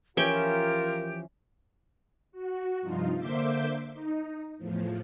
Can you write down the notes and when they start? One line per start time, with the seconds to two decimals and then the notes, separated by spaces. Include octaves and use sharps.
0.17 E3 F3 C#4 F4 G4 A#4 E5 G5
2.32 F#4
2.81 G2 C3 F3 D#4 F4
3.17 D3 A#3 C5 E5 D6 G6
3.93 D#4
4.58 E2 A2 F3